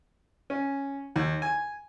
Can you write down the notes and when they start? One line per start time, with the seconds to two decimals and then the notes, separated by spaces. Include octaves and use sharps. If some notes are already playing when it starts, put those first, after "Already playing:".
0.50 C#4
1.16 D#2
1.42 G#5